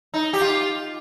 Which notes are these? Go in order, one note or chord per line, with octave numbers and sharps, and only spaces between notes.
D#4
G4
F4